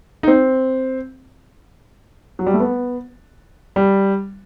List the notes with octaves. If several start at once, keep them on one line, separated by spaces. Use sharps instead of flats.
D#4
C4
F#3
G3
A3
B3
G3